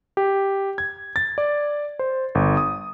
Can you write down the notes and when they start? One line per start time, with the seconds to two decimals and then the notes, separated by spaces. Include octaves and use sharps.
0.17 G4
0.78 G#6
1.16 A6
1.38 D5
1.99 C5
2.35 G1
2.57 D#6